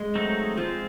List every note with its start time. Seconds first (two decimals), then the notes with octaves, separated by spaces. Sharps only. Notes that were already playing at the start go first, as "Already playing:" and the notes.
Already playing: G#3
0.15 F#3 A3 C4 D#4
0.57 F3 G#3 C4 F4